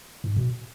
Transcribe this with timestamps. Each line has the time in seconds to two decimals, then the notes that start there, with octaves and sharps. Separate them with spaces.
0.24 G#2
0.36 B2